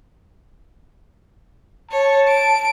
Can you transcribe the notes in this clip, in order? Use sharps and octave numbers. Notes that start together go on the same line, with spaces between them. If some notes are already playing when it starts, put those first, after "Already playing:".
C#5 A5
D7